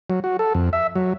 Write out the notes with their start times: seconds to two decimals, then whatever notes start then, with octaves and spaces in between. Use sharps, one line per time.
0.10 F#3
0.24 F#4
0.39 A4
0.55 F2
0.73 E5
0.96 F#3